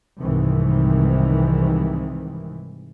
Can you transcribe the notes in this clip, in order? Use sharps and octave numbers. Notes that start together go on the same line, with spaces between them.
C2 G#2 C3 D#3 E3